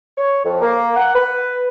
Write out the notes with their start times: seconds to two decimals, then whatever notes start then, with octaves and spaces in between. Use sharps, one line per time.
0.18 C#5
0.44 F2
0.61 A#3
0.96 F#5
1.14 B4